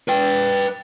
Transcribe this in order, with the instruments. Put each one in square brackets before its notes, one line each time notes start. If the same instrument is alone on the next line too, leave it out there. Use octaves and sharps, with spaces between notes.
[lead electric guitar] B4 G5